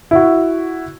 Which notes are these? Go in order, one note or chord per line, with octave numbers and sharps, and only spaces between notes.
E4 F#4